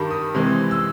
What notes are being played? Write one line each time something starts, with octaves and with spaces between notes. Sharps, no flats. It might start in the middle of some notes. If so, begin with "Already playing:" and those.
Already playing: G2 D#3 G3 B5
D#6
C3 E3 G#3 C4
E6